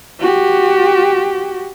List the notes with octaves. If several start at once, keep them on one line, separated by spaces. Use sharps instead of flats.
F#4 G4